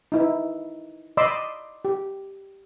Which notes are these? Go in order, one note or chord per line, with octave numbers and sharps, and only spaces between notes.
D#4 E4 B4
D5 D#5 B5 C6 D6 E6
G4